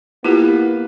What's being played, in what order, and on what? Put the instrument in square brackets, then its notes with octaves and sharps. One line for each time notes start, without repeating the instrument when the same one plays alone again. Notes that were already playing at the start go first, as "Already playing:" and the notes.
[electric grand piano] A#3 B4 [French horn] B3 [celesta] E4 [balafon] F4 G4